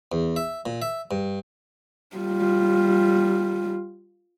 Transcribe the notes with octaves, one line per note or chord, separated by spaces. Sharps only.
E2
E5
A#2
E5
G2
G3 F4